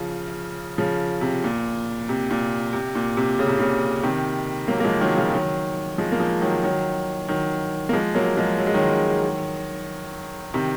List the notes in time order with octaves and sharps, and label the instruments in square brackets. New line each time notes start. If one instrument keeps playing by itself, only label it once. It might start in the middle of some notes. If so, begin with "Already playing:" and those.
Already playing: [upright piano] C#3 F3
C#3 F3
C3
A#2
C3
A#2
C3
A#2
C3
C#3
C3
A#2 C#3
C3 D#3
F#3 A#3
A#3
F3 G#3
D#3 F#3
C#3 F3
D#3 F#3
F3 G#3
A#3
F3 G#3
D#3 F#3
D#3 F#3
D#3 F#3
A#3
F3 G#3
F#3 A#3
F3 G#3
F#3
G#3
D#3 F#3
C3 D#3